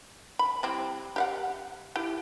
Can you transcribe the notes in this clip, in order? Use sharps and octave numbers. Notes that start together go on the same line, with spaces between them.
B5
G3 C4 E4
G4 F5 F#5
E4 G4